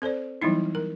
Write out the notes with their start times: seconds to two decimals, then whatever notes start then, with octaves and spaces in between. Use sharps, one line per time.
0.02 C4 A4 C5 D5
0.42 E3 F#3 G3 B3 D#4 E4
0.75 A#4